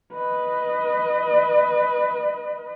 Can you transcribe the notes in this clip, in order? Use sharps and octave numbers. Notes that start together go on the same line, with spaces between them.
B4 D#5